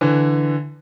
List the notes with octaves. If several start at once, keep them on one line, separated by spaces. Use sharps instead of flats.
D3 E3